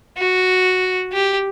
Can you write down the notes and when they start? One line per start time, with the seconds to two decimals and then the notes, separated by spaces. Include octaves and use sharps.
0.17 F#4
1.13 G4